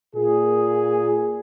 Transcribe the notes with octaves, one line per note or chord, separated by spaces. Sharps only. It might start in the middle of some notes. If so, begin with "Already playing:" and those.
A#2 G#4